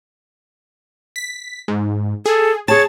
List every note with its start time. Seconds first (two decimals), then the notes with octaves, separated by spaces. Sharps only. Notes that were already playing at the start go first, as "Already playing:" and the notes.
1.16 B6
1.68 G#2
2.26 G#4 A4
2.68 G#4 C#5 A5 A6